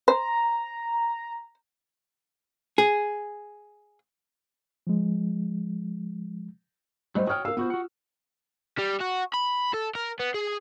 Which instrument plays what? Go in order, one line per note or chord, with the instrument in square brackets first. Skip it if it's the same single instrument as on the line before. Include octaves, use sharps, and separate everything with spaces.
[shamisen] C5 [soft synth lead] A#5
[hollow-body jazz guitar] G#4
[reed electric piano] F3 G#3
[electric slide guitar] F#3 G3 A3 [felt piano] C5 D#5
[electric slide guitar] F#4 C#5 G5 [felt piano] D#6 F6
[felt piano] A#4 E6 [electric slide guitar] F5
[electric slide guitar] B3 F#4 C5 [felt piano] F4
[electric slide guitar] F#4 F#5
[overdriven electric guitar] G3
F#4
B5
A4
A#4
B3
G#4